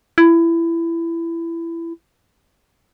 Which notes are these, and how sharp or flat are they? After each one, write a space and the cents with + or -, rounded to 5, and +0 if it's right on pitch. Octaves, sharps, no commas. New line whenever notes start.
E4 +20